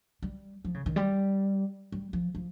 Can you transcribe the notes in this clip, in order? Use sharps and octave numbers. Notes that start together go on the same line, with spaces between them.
G3
F3
C#3
D#3
G3
G3
F3
F3